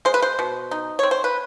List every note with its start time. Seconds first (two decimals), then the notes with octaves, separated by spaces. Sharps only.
0.05 G#3 C5
0.14 B4
0.22 C5
0.39 B2
0.71 D#4
0.99 C4 C#5
1.11 C5
1.24 B4